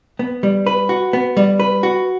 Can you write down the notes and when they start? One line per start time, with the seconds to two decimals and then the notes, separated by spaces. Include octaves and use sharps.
0.19 B3
0.43 G3
0.67 B4
0.89 F#4
1.13 B3
1.37 G3
1.60 B4
1.83 F#4